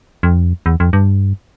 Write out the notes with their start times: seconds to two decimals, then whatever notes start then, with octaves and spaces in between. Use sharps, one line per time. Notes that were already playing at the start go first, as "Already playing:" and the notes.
0.23 F2
0.66 E2
0.80 F2
0.93 G2